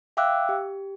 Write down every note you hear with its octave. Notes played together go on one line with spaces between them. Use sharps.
E5 F5 G5 D6 E6 F#6
G4